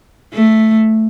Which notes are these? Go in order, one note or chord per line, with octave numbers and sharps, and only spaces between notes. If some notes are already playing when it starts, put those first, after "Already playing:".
A3